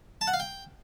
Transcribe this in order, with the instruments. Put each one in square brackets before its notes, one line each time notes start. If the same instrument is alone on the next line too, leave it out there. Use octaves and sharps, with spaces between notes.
[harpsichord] A5
F#5
F5
G5